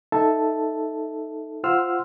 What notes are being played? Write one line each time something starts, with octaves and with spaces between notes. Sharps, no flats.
D#4 A4 E5 A5
F4 C5 F#5 C6 E6 F6